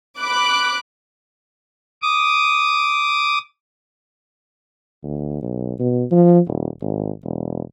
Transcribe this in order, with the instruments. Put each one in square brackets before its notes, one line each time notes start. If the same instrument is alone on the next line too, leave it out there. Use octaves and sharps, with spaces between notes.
[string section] B5 D6 F#6
[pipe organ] D6 D#6
[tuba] D2
B1
B2
F3
D#1
G#1
E1